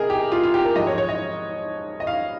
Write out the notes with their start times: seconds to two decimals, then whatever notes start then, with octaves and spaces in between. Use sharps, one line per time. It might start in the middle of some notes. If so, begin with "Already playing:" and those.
Already playing: C3 G#4 A#4 D#5
0.10 G4
0.32 F4
0.43 F4
0.54 G4
0.64 A#4
0.76 G#2 F3 G#3 D#5
0.87 C#5
0.98 C#5
1.09 D#5
2.00 D#5
2.07 F5